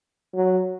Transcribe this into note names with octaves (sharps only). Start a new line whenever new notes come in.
F#3